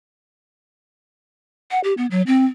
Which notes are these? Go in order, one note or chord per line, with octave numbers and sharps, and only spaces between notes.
F#5
G4
B3
F#3
C4